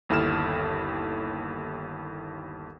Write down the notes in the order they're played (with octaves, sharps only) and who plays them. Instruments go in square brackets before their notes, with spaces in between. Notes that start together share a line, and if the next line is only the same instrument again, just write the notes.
[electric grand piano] G1 D#2 E4 A4 F6 E7